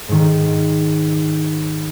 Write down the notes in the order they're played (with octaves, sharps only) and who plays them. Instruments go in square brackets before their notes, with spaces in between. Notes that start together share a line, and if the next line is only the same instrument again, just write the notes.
[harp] G#2 D#3